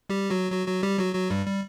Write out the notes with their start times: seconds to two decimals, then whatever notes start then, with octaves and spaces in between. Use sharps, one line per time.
0.09 G3 G4
0.30 F#3 F#4
0.51 F#3 F#4
0.67 F#3 F#4
0.83 G3 G4
0.99 F#3 F#4
1.14 F#3 F#4
1.30 G2 G3
1.46 G3